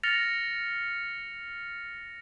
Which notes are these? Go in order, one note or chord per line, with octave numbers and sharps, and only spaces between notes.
F6 A6 A#6 C#7 F7